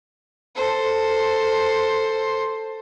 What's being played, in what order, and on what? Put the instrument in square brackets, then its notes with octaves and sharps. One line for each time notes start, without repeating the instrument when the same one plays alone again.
[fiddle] A4 C5